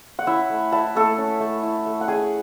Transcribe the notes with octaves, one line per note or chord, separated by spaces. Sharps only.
F#5
C#4 E4 E5
A3
E4 A5
A3 A4 A5
C#4
A3
E4
A3
F#5
C#4 G#4 G#5